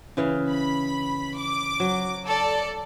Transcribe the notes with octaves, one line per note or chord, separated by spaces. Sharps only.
C#3 E3 F5
B5
D6
F#3
A4 D5